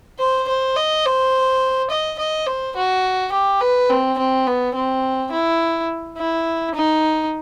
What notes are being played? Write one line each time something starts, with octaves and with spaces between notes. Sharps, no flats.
C5
C5
D#5
C5
D#5
D#5
C5
F#4
G4
B4
C4
C4
B3
C4
E4
E4
D#4